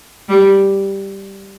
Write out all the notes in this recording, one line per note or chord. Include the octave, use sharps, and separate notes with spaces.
G3